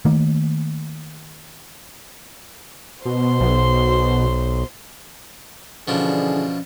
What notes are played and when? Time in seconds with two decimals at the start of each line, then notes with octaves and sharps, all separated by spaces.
0.05 D#3 A3 A#3
3.05 B2 C5 C6
3.40 B1
5.88 B2 D3 E3 F3 C#4 D4 G#4